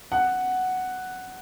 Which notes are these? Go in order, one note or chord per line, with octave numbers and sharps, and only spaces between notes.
F#5